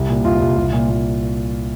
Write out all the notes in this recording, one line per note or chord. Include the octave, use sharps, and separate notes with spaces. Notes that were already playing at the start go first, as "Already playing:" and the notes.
Already playing: C2
A#2
C2 F4
C2
C2
A#2
A#2